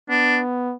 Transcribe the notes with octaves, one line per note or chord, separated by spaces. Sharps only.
B3 D4